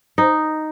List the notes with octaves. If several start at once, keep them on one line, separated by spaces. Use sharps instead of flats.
D#4